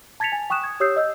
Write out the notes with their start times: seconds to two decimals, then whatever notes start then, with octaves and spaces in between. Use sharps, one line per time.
0.20 A5 G#6 A6 B6 C#7 F7
0.32 G#5
0.50 G5 C#6 D#6 F#6 E7
0.64 D#6 G#6
0.80 G4 C#5 D#6 E6 G6 C7
0.96 D#5 E6 G6